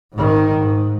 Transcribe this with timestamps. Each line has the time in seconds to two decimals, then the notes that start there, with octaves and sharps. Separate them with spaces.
0.13 G#2 D#3
0.57 G#2